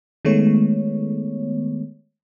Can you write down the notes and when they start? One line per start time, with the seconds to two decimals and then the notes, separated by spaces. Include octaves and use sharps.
0.25 D#3 G#3 A3 B3 C#5